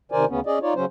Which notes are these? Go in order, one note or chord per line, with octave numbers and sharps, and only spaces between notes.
C3 D#3 A#4 C5 D5 G#5
D2 C#3 B3 C#4
C#4 G#4 D5 D#5
D#4 F4 C#5 D5
C#3 F#3 C#4 C5